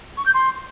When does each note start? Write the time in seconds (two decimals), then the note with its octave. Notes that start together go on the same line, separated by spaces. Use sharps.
0.18 C#6
0.26 G6
0.34 C6